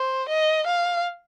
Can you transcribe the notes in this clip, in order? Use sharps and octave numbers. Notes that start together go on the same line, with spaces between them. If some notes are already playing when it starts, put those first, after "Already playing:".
Already playing: C5
D#5
F5